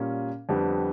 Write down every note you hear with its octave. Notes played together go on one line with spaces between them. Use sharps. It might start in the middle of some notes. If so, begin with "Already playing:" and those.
Already playing: A#2 G3 A#3 C#4
F2 D3 G3 B3